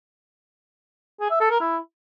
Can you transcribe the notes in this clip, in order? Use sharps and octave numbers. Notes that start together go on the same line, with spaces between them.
G#4
E5
A4
A#4
E4